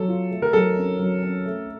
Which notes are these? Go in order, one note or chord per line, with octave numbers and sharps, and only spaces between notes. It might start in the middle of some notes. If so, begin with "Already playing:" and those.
Already playing: F#3 A4
F4
A3
A#4
F#3 A4
C#4
F#3
C#4
A3